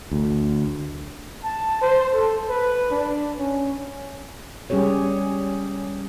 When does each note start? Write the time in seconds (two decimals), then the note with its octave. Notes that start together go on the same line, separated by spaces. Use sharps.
0.11 D2
1.44 A5
1.82 C5
2.14 A4
2.49 B4
2.91 D4
3.38 C#4
4.70 G3 C#4 G4 G#4 C#5